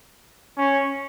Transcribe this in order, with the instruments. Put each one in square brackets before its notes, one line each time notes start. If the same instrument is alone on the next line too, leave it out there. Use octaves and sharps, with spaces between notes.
[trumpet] C#4